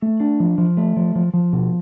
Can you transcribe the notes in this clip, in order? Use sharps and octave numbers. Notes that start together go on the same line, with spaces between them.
A3
D4
F3
F3
A3
F3
F3
F3
B2